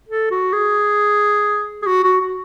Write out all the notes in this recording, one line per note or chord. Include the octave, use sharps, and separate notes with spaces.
A4
F#4
G#4
G#4
F#4
F#4
F#4